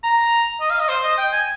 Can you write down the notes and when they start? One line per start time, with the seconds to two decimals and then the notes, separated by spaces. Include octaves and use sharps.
0.04 A#5
0.60 D#5
0.70 F5
0.80 D#5
0.89 C5
1.04 D#5
1.18 G5
1.33 G#5